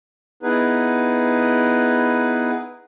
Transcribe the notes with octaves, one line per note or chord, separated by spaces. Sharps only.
B3 D#4 E4 G#4 B4